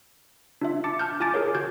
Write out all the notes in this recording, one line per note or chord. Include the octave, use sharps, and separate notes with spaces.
D4 F4 E5
A5 D6 A6 C#7
A5 F6 G6
F4 G#5 A5 D6 A6 D7
G#4 A#4 C#5
F#4 G6 G#6